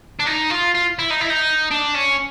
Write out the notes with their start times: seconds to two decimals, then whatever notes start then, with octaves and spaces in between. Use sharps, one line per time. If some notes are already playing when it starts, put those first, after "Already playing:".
0.20 D4
0.27 D#4
0.51 F4
0.75 F4
0.99 E4
1.11 D#4
1.21 E4
1.30 D#4
1.71 D4
1.95 C#4